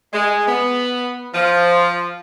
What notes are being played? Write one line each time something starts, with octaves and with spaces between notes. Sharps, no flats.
G#3
B3
F3